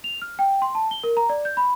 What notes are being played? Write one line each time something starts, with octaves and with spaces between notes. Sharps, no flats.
F7
F6
G5
C6
A5
G7
A#4
A#5
D5
G6
B5